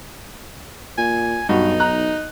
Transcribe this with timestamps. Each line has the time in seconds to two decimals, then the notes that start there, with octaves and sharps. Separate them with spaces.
0.98 A#2 G#5
1.49 B1 G2 D#4 F#4
1.80 A#5 F#6